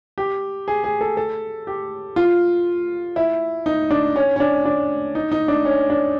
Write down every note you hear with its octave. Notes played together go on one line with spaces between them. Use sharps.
G4
G#4
G#4
A4
A4
G4
F4
E4
D#4
D4
C#4
C#4
D4
D4
D#4
D#4
D4
C#4
D4